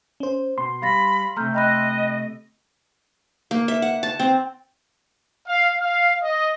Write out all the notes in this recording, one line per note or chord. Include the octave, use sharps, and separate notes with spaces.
C#4 C5
B2 C6
G3 F5 B5 A6 A#6
C3 A3 A#5 F6 G6
D#5 G5 B5 F#6
A#3
E5
F#5
A5
C4
F5
F5
D#5